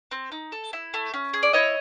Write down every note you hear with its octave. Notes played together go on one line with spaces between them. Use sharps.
C4
D#4
A4
E4
A3
C#4
G#4
D5
E4 C#5 D#5